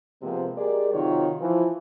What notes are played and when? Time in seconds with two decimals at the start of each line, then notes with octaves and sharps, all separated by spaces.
0.22 C3 F3 G#3 A#3 B3
0.56 G#3 G4 G#4 A#4 D5
0.93 C3 D#3 F#3 F4 C#5
1.40 E3 F3